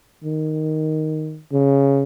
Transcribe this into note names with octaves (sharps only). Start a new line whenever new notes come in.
D#3
C#3